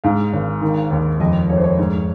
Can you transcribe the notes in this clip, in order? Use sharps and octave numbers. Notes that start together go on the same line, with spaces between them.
G#2 F5
G#1
D#3
D#2
F2 D#5
F1 C#5
C5
C#5
G#2